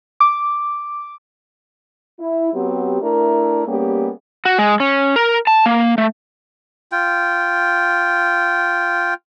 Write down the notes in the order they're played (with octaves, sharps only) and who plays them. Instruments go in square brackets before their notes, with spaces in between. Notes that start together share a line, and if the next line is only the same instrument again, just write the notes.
[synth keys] D6
[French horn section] E4
F#3 B3 C4 G4
A3 D4 E4 A#4
G3 A#3 B3 C#4 G4 G#4
[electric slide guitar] F#4
G#3
C#4
A#4
A5
A#3
A3
[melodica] F4 G5